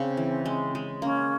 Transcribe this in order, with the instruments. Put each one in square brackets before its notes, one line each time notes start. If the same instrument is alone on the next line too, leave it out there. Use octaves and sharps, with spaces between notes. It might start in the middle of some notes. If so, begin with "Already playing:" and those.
Already playing: [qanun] C#3 D4 [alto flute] C4
[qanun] E3
G#3
G#3
[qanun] A#3 [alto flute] C#4